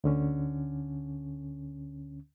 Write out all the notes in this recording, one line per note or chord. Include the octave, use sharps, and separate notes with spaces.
D2 D3 C#4